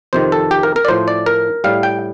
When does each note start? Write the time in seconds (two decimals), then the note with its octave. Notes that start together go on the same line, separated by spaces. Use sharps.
0.13 F2 C3 D#3 C5
0.32 A4
0.51 G4
0.63 A#4
0.76 A#4
0.85 D5
0.88 A2 F3 C5
1.08 D5
1.26 A#4
1.64 A2 G3 F5
1.83 G5